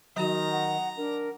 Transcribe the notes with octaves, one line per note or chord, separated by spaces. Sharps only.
D#3 F#3 F#4 A#5
F#5
D4 A#4